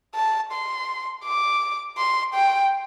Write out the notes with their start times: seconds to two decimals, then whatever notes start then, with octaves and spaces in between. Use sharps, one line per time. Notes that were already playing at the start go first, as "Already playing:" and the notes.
0.15 A5
0.52 C6
1.24 D6
1.98 C6
2.34 G5